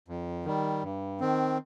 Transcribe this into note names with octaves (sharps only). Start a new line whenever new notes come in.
F2
D#3 G3
G2
D#3 C4